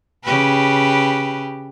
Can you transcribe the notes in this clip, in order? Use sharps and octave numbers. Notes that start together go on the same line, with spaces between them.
C#3 G4 B4